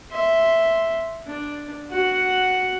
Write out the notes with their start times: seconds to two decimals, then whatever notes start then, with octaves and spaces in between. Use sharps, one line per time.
0.11 E5 C6
1.27 D4
1.90 F#4 F#5